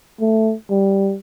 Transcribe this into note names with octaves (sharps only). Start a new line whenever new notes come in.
A3
G3